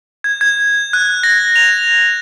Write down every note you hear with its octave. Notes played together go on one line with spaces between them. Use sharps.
G#6
G#6
F#6
A#6
F7